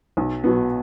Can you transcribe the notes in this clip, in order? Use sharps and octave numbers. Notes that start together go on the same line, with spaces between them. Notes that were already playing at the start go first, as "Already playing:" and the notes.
B1
B2 F#3 B3